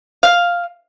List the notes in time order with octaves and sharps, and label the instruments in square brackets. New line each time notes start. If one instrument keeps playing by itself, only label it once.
[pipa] F5